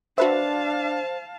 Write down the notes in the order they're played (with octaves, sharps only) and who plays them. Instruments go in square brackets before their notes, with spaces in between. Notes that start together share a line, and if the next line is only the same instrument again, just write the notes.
[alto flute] D4 [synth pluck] F#4 B4 E5 [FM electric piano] C5 [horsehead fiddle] F5 A5